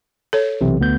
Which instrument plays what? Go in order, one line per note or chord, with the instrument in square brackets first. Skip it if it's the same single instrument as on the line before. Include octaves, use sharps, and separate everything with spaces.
[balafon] A4 C#5
[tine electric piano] B1 C3 E3
D2 B3 G6